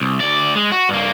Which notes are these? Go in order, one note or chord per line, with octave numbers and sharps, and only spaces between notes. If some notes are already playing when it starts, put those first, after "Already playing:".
C2
D2 D5
G#3
F#4
G2 A#3